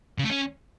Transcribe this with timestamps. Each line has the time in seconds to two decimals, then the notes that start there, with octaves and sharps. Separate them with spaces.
0.18 C#3
0.24 A3
0.30 C#4